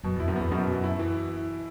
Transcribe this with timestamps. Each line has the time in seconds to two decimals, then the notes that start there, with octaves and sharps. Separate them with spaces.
0.03 F#2 B2
0.16 E2 E4
0.28 F#2
0.36 E2 B3
0.51 F#2 B2
0.67 B2
0.84 E4
0.99 E3